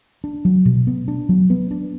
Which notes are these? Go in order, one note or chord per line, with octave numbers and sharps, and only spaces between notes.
D4
F#3
B2
B3
D4
F#3
B3
D4